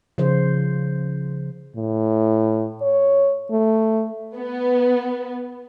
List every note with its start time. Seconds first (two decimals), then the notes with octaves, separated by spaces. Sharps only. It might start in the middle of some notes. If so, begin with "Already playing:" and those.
0.18 C#3 F3 C5
1.76 A2
2.82 C#5
3.51 A3
4.37 B3